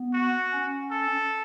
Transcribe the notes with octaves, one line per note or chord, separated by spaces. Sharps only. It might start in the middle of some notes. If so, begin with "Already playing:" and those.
Already playing: B3
F#4
C#4
A4